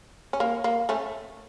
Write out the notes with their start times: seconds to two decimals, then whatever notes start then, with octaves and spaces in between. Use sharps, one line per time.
0.33 C#4
0.40 A#3
0.64 A#3
0.89 A3 C#4